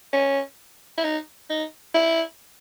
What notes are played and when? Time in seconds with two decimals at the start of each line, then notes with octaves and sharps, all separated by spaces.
0.13 C#4
0.98 E4
1.04 D#4
1.50 D#4
1.94 E4